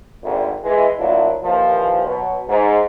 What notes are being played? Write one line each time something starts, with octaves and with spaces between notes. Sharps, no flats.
G#1 D2
E3 G#3
A#2 F#3 A3 A#3 D4 E4
D#2 A#2 E3 F3
B2 F#3 B3
G#2